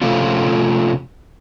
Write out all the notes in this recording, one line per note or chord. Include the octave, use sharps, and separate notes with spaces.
C3 F3 A3 C4 C#4 F4